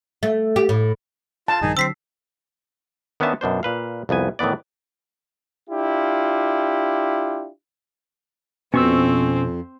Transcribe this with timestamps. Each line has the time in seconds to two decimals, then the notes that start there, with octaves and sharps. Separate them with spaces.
0.23 A3
0.56 G4
0.69 A2
1.48 F4 A5
1.61 A#1 G2 D#3 D#4 G#4
1.77 D3 F#3 C4 E6 B6 C7
3.20 D#3 B3 C#4 D4 E5 A5
3.41 F#2 B2 D4 C5
3.63 A#2 B4 F5
4.09 C2 F2 B3 G#5
4.39 A2 D#3 E3 B3 D5
5.70 D4 E4 F4 G4
8.74 F2 B2 C4 C#4 C#6 E6